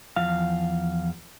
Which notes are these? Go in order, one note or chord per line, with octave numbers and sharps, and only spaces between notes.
E2 F3 F5